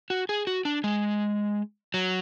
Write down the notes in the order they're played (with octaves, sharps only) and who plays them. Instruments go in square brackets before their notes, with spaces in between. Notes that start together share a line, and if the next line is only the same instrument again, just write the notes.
[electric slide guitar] F#4
G#4
F#4
D4
G#3
F#3